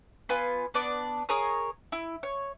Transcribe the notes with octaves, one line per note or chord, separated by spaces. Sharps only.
B3 F4 G#5
B3 D4 D5 D6
G#4 A#4 C#5 D#6
E4
C#5